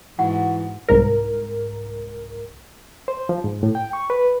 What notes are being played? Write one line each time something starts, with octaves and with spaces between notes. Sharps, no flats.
G#2 E3 F#4 F#5
C2 G#2 A#4
C5
F3
G#2
A2
G5
C#6
B4